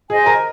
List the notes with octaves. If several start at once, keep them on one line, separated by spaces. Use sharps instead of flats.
G#4 C5 D#5 G#5
A#4